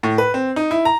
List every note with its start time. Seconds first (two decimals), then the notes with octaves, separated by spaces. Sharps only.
0.03 A2
0.18 B4
0.34 C4
0.56 D#4
0.71 E4
0.85 A#5